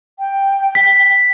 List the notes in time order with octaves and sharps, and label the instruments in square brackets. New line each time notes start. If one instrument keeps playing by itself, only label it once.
[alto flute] G5
[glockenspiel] B6